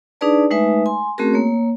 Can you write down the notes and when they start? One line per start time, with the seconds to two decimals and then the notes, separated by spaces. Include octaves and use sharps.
0.21 D4 D#4 G#4 B4 D5 A5
0.51 G#3 A3 D#4 B4 E5 G#5
0.86 G#5 C6
1.18 A3 C4 C#4 F#4 G#4 A#4
1.33 A#3 C#5